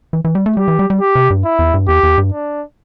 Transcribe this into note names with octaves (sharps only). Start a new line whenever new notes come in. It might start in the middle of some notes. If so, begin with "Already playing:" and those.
E3
E3
G3
A3
G3 G4
E3
G3
G3
G4
C3
G2
E4
E2
G2
E2 G4
E2
G2
D4